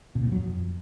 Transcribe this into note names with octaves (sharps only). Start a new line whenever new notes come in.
B2
A#2
G2
F#3
F2